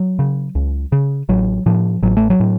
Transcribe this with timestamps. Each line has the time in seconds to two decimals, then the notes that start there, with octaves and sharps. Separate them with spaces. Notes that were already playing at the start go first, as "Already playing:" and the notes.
Already playing: F#3
0.19 C#3
0.55 C#2
0.92 C#3
1.29 A1 F#3
1.66 A2 F3
2.03 A1 F#3
2.17 A3
2.30 F#3
2.40 A2